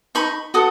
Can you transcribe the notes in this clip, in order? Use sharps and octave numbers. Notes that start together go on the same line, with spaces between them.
D#4 B5 C#6
F#4 A4 D#6